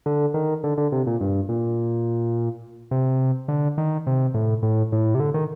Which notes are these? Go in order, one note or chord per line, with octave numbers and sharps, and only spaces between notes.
D3
D#3
D3
D3
C3
A#2
G2
A#2
C3
D3
D#3
C3
A2
A2
A2
C3
D3
D#3